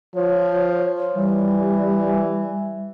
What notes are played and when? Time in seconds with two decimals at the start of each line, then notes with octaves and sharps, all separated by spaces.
0.15 F3 C#5
1.15 E3 G3